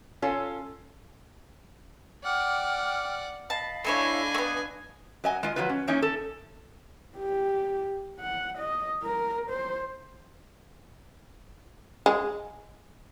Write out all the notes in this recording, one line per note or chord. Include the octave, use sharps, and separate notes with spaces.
C#4 F4 A4
D5 F#5 G5 D6 F6
D#5 F5 A5 B5
A3 D4 E4 C#5 G#5
A3 B3
F#3 D#5 G#5
G#3 F4 D#5
F3 F#3 G#3 F4 B4
C#4
E3 A#3 C#4 D#4
A4
G4
F#5
D#5
A#4
C5
G#3